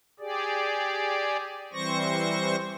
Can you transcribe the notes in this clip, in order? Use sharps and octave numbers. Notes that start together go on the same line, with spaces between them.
G4 G#4 D5
E3 G3 C4 C5 C#6 A#6